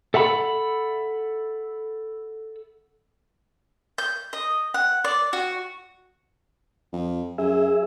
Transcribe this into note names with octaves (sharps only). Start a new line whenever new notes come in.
A4 E5 F#5 A#5 B5
G6
D#5
F#5
D5
F#4
F2
F#2 G#4 E5